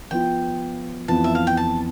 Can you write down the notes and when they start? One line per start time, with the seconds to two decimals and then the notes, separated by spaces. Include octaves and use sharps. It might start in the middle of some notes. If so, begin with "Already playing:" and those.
0.11 F3 B3 F4 G5
1.08 F2 E3 B3 F4 A5
1.24 E5
1.35 F5
1.47 G5
1.57 A5